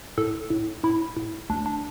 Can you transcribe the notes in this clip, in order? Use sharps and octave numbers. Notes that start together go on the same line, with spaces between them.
A2 A4
A2
A2 E4
A2
D2 D4
D4